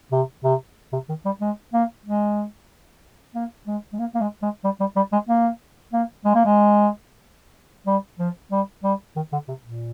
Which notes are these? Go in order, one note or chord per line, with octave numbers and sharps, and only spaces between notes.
C3
C3
C3
D#3
G3
G#3
A#3
G#3
A#3
G#3
G#3
A#3
A#3
G#3
G#3
G3
G3
G3
G#3
A#3
A#3
G#3
A#3
G#3
G3
F3
G3
G3
D#3
D3
C3
A#2